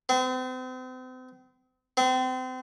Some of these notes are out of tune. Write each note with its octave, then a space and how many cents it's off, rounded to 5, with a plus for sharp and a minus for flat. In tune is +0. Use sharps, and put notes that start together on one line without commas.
C4 -40
C4 -35